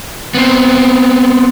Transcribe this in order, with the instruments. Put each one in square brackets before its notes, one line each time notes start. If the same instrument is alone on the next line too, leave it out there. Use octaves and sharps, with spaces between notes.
[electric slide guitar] B3 C4